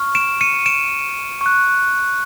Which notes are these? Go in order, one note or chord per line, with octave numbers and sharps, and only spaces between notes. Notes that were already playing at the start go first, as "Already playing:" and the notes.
Already playing: C#6 F6
D7 E7
C#7 D#7
D7 E7
C#6 F#6